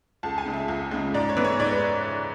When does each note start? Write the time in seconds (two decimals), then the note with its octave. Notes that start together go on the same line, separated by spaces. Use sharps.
0.23 C#2 A5
0.38 G#5
0.46 C#3 G#3
0.54 E5
0.68 C#2
0.91 C#3 G#3
1.14 G#2 D5
1.29 C#5
1.37 E3 B3
1.45 C#5
1.59 G#2 D5
1.71 B4